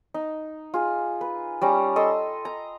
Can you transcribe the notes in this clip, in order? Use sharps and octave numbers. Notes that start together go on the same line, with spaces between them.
D#4
F4 G#4
B4
G3 C#4 A#5
A4 D#5 C6 E6
A#5